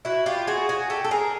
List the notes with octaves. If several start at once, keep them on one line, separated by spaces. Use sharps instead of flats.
E4 F#4
F4 G4
F#4 G#4
F#4 G#4
G4 A4
A4
G#4 A#4